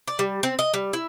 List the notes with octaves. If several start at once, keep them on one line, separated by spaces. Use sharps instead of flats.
D5
G3
C4
D#5
G3
E4